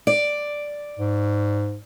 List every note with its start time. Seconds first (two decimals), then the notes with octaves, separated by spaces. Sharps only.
0.07 D5
0.99 G#2